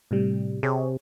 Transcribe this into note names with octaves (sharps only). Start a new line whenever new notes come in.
A2 C3 G3
C3 G#4 C#5